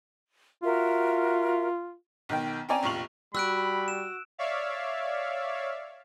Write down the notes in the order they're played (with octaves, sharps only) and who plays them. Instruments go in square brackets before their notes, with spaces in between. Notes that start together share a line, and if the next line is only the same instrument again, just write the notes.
[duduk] F4 [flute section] F#4 A#4 E5
[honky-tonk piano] B1 D#3 G5
C4 C#4 D5 G#5 A#5
F1 A#1 F4 C#6 F7 F#7
[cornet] G3 [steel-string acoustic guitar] F#4 [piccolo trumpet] B5 [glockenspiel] E6 F#6 D7
[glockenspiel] E7
[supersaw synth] C#5 D5 E5 F5